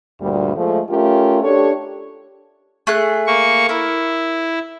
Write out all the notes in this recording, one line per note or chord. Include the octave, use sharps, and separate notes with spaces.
D2 G2 A#2 G3
F3 G#3 A3
A3 C#4 F4 G4 A#4
D4 G4 A4 C#5
A3 G#4 F#6
A#3 C#6
E4 A#4